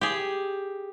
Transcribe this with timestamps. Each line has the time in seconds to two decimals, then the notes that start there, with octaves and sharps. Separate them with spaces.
0.01 G4 G#4